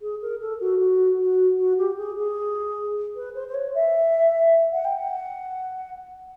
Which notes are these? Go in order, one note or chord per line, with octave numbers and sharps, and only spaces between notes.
G#4
A#4
A4
F#4
F#4
F#4
F#4
G4
G#4
G#4
B4
C5
C5
C#5
E5
F#5
G5
F#5